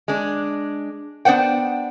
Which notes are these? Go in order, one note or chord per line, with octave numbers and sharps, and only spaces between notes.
G#3 D4
B3 D4 C5 F#5 G5